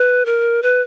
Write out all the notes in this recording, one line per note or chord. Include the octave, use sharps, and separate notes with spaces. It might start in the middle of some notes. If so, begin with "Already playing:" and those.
Already playing: B4
A#4
B4